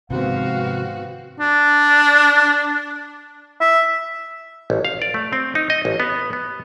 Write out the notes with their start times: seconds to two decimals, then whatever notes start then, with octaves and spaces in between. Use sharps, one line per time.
0.10 G#2 C3 D#3 F3 B3 C4 F#4 F5
1.40 D4
3.61 E5
4.70 A1
4.85 F5
5.02 D5
5.14 A3
5.33 C4
5.55 D#4
5.70 D#5
5.85 A1
6.00 B3
6.33 B3